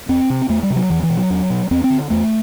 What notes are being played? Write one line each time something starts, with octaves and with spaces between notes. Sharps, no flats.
E2 C4
C3
E2 A3
G3
C3
F#3
E2 E3
E3
B2
F#3
E2
B2
E2 C4
C4
D3
E2 A3